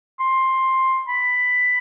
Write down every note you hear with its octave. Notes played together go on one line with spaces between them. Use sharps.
C6
B5